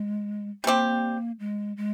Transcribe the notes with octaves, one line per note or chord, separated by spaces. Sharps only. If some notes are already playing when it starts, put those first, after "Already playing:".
Already playing: G#3
G3 A#3 C4 G4
G#3
G#3